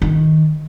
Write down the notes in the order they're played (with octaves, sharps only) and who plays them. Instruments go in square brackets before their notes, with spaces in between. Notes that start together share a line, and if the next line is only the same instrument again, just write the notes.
[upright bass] D#3